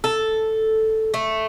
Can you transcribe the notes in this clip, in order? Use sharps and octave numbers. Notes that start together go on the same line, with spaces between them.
A4
A3